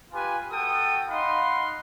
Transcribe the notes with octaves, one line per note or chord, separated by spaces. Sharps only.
F4 G4 B4 G#5
F#4 A4 F#5 G5 D#6
D#4 F5 F#5 B5 C6